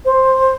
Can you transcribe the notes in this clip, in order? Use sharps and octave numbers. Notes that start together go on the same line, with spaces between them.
C5